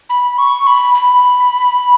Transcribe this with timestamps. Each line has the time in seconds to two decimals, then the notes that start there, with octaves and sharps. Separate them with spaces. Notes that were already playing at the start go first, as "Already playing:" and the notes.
0.10 B5
0.38 C#6
0.67 B5
0.95 B5